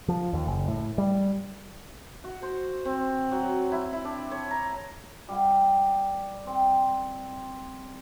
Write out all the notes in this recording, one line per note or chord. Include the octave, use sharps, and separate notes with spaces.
F3
D#2
F#1
A2
G3
F#4
C5
C4
F#3
E4
E4
D4
C#5
A#5
G3 F#5
C4